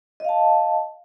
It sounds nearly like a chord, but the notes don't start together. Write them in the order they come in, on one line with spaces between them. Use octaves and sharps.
D#5 F5 A5